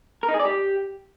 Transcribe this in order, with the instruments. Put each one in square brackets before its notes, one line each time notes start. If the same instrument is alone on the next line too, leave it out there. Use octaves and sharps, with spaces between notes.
[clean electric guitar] A#4
D#4
G#4
D5
G4